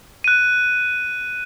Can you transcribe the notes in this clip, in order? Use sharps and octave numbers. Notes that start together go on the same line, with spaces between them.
F#6 D#7